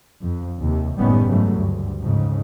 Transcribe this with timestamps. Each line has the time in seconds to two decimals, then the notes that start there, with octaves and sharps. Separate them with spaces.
0.22 F2
0.60 D#2 C3
0.97 F#1 A2 D#3 G3 B3 C#4
1.26 G#2 C#3 E3 F#3 A3
1.56 D2 G2
2.03 F2 G#2 C#3